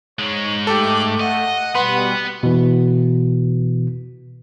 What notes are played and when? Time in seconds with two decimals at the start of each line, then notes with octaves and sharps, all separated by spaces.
0.19 G#2 G#3 C#5
0.67 A3 G4 A4 D6
1.20 D#5 F#5
1.75 B2 G3 B3 B4 C6
2.43 B2 E3